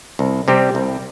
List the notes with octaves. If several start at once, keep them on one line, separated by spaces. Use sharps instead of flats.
C2
C3 G3 C4 G4
C2